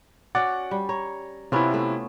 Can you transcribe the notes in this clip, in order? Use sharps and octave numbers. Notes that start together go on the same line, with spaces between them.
C#4 F#4 D5 F#5 D6 A6
G3
C#5 A#5
C3 B3 C#4 E4 F4
A3